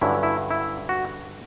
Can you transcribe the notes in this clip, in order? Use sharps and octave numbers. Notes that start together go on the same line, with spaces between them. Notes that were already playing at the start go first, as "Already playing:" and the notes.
G2 D3 F#3 C#4 E4
E4
E4
F#4